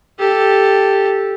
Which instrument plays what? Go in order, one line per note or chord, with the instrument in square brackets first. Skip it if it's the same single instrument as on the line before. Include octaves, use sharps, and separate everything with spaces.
[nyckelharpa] G4 A4